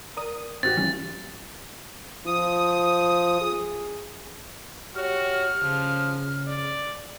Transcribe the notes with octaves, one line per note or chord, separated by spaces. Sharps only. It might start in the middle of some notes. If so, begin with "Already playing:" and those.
A#4 D5 D#6
G#1 C4 F#4 G4 F#6 A6 A#6
E3 F3 G3 C#4
F3 D#6
G#4
F#4 G4 C#5 F6
C#3 F3
D5